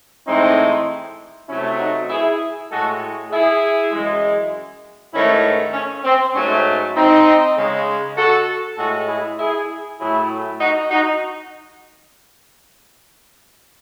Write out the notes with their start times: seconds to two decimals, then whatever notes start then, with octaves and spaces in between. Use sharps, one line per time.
0.27 A2 E3 G#3 C4 D#4
1.49 C3 F#3 A3 C#4 E4
1.79 D#4 F#4
2.10 E4 G#4
2.71 A2 G#3 F#4 A4
3.31 E4 G#4
3.92 F#2 E3 G#3
5.13 G#2 D#3 A3 C#4 E4
5.74 C#4
6.04 C4
6.35 G#2 F#3 A3 C#4
6.96 C4 D#4
7.57 C#3 G#3
8.17 F#4 A4
8.78 A2 G#3 F#4 A4
9.08 E4 G#4
9.38 E4 G#4
10.00 A2 F#3 A3 E4 G#4
10.60 D#4 F#4
10.91 D#4 F#4